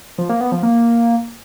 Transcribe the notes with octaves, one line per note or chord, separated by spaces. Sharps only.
F3
A#3
B3
F3
A#3